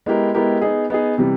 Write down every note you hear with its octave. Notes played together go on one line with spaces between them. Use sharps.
G#3 B3 E4 G4 A#4
G#3 B3 E4 G4 A#4
B3 D#4 G#4
B3 D#4 G#4
C3 E3 G3